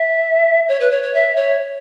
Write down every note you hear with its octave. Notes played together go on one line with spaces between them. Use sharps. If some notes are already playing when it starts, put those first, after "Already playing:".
Already playing: E5
C#5
B4
C#5
C#5
E5
C#5